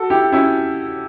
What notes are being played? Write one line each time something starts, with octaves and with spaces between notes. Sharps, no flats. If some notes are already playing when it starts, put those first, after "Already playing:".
Already playing: F#4 A4
E4 G4
C#4 E4